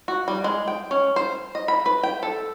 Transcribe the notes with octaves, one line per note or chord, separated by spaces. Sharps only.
F#4
G3
G#3
G5
C#4
C5
D#5
B5
B4
G5
A4